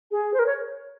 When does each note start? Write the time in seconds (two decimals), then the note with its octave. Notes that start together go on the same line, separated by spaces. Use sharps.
0.11 G#4
0.34 C5
0.39 A#4
0.46 C#5